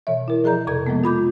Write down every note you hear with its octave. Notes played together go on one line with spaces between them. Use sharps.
B2 E3 C#5 E5
E4 A#4
F3 G#4 D5 A#5 G6
F2 C3 A4 G#6
F3 G#3 A#3 B3
F4 B5 D6 G6